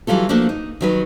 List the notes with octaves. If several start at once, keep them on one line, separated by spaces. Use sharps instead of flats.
E3 F#3 G3 F4 A4
F3 A3 A#3 D4 F#4
D#4
D#3 F#3 B4